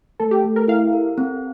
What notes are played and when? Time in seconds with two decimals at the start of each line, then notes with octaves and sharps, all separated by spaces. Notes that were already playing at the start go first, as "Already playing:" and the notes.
0.20 A3 A4
0.31 G4
0.44 A3
0.56 A#4
0.68 E4 F5
0.93 A#4
1.18 C4